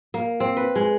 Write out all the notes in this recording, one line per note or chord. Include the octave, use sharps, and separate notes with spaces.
A#3
C4
B4
G#3